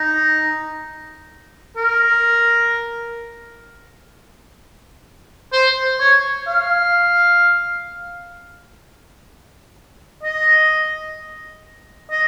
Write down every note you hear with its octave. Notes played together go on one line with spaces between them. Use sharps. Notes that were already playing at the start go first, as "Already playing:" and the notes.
Already playing: D#4
A#4
C5
C#5
F5
D#5
D#5